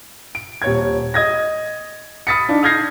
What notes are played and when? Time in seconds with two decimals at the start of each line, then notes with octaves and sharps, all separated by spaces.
0.35 D7
0.62 D#1 C#5 G#6
1.14 D#5 D#6 G#6 A#6
2.27 B5 D#6 F6 A6 B6 C#7
2.49 D4 D#4
2.63 D#6 F6 G6 G#6 A#6 C7